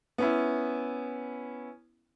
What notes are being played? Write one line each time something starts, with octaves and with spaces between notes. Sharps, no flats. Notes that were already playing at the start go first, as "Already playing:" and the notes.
B3 C#4 E4